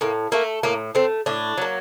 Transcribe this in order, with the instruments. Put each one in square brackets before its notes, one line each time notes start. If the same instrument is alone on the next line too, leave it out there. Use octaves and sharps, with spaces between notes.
[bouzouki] A2 A#3
A3 A#3
A2 A#3
A3 C4
A2 D4
F#3 A#3